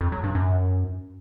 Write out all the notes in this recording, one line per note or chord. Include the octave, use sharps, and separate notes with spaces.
F2
F#3
G2
F#2